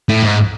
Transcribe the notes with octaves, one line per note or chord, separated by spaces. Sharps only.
A2
G#2